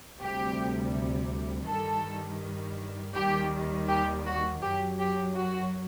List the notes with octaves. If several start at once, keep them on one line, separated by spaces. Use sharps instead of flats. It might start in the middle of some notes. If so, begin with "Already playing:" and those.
D2 C3 G3 G4
G2 D#3 G3 A4
D#2 D#3 G3 G4
G4
F#4
F#2 F#3 G4
G4
F#4